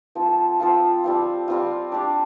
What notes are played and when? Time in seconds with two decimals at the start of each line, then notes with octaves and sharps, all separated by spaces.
0.15 F3 C4 F4 A4
0.60 F3 C4 F4 A4
1.04 G3 C4 F4
1.48 G3 C4 F4
1.92 D4 G4 D5